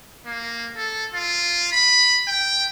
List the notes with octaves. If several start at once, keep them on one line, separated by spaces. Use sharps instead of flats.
A#3
A4
F4
B5
G5